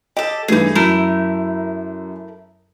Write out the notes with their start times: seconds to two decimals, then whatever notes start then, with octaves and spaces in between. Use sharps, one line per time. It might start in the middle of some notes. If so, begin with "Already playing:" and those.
0.17 G4 A4 D#5
0.48 G2 E3 A3 D#4 G#4
0.75 F#2 A3 E4 A#4